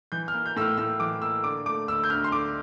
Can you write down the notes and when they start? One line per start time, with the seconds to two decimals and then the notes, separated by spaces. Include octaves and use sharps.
0.12 E3 G6
0.28 F6
0.34 A#3
0.46 G6
0.56 A2 E6
0.61 F6
0.78 A2 E6
1.00 E3 D6
1.22 A#3 E6
1.44 D3 D6
1.66 A3 D6
1.88 D2 E6
2.04 G6
2.10 D2 F6
2.24 C6
2.32 D3 D6